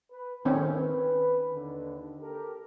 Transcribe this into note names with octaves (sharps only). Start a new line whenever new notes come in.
B4
E2 A2 D#3 C4 C#4
B4
D#2 D3
G4 A4 A#4